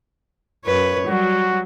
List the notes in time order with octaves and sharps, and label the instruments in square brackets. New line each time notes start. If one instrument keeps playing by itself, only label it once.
[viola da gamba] F#2 B4 C#5
[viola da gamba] F#3 G3 [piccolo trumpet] F#4